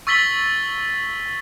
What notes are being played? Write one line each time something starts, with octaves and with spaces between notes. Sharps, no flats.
C#6 E6 A6 B6 F#7 G7